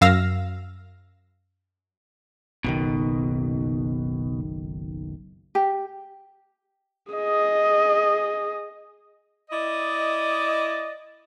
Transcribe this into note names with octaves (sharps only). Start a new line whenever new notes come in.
F#2 F5 E6 A#6
F#1 B1 B2 D#3
G4
G#4 D#5
E4 D5 D#5